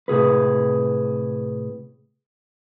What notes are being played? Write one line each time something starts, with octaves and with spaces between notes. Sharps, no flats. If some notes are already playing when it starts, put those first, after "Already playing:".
A2 C3 G#4 B4